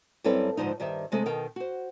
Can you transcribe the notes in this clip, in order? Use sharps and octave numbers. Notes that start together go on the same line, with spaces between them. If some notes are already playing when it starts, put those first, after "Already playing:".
F#2 G3 C4 E4 A4 B4
G#2 D3 F3 D#4
G2 D#3 G4 C5 E5
C3 G#3 A3 G#4 A4
B2 D#3 A#4 G5
F#4 C5